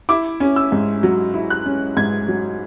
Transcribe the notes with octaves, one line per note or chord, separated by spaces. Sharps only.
E4 D6
C#4
E6
G#2
F#3
E4
F#6
C#4
G#2 G#6
F#3